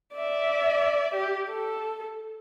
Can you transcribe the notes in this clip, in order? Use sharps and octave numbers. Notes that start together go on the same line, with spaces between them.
D5 E5
G4
A4